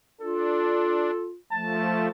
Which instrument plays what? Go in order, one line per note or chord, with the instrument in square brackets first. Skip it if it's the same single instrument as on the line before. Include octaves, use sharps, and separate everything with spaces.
[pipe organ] D4 [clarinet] F4 [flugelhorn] A4
[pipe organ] F3 A3 [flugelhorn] A5